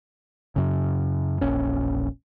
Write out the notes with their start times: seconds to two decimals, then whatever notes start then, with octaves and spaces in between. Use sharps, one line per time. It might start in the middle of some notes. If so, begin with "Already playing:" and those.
0.56 F#2 C#3
1.41 E1 A#1 C#4